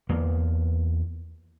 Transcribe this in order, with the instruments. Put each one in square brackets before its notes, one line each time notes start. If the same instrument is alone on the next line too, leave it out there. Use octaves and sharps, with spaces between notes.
[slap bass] E2 A#3